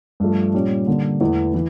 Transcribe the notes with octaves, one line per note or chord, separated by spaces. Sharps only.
G2 F3 A3
A#2 G3 C#4
D3 G3 A#3
E2 E3 A3
E3